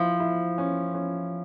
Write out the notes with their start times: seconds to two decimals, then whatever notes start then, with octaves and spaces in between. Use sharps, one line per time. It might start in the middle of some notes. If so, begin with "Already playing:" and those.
Already playing: F3 E4
0.20 E4
0.58 C#4
0.94 C#4